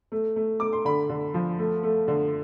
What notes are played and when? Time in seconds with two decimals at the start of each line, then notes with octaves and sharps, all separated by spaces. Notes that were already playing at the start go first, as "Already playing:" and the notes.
0.12 A3
0.36 A3
0.60 A3 D6
0.73 C6
0.85 D3 B5
1.09 D3
1.34 F3
1.59 A3
1.83 A3
2.08 D3